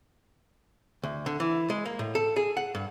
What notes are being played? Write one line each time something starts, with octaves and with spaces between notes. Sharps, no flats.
D2
D3
E3
G#3
A#3
A2
A4
G#4
F#5
G2